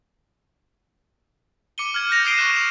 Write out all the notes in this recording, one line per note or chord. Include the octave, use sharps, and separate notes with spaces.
D6 C#7 D#7 G7
F6 G#6 D#7
F#6 G6 A#6 F7
D#6 G#6 C7 D7 D#7 G7
C#6 F#6 E7
F7